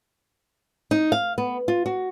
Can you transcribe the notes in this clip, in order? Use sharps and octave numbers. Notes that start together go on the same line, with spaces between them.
D#4
F5
B3
F4
F#4